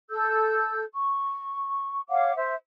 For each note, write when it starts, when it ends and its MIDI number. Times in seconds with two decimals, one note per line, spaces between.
0.10 0.84 69
0.10 0.84 88
0.10 0.84 91
0.93 2.01 85
2.10 2.33 73
2.10 2.33 77
2.10 2.33 78
2.10 2.33 86
2.35 2.53 72
2.35 2.53 76